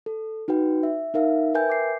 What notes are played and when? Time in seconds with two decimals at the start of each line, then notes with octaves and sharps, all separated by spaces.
0.06 A4
0.48 D#4 F#4 B4 G5
0.83 E5
1.14 D#4 A#4 E5 F5
1.54 A#4 B4 E5 G5 G#5 G6
1.70 D6 C7